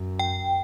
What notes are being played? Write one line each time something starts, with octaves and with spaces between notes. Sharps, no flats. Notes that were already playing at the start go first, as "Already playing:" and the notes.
Already playing: F#2
G5